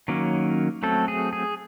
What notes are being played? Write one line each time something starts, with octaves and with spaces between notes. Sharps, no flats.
D#3 F#3 A#3 C#4
F#3 A3 C4 A4
G#4
G#4